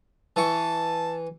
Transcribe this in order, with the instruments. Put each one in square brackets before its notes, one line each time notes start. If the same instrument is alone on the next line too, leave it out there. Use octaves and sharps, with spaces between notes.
[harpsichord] E3 C#6 [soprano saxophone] A5